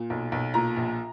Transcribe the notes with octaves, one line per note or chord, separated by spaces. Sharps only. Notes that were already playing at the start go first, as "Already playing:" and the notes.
Already playing: A#2
B1
B1
A#2 A#5
A#1